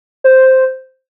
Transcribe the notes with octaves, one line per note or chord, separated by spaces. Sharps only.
C5